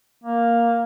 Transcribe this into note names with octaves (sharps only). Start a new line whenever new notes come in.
A#3